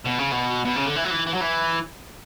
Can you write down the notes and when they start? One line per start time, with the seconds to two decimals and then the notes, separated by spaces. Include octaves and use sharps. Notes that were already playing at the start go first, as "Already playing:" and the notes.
0.05 B2
0.18 C#3
0.31 B2
0.65 B2
0.76 C#3
0.86 D3
0.96 E3
1.04 F#3
1.11 E3
1.27 E3
1.34 F#3
1.41 E3